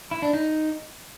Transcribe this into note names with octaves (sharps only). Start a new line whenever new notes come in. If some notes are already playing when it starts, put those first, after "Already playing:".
E4
D4
D#4